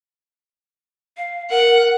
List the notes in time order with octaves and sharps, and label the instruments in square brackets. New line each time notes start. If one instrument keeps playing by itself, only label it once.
[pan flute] F5
[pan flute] A#4 [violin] F#5